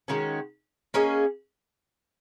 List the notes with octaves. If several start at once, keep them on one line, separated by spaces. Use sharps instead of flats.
D#3 G#3 C#4 F#4
A#3 C#4 G#4 D#5